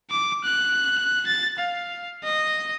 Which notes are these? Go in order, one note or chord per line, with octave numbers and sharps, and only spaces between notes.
D6
F#6
A6
F5
D#5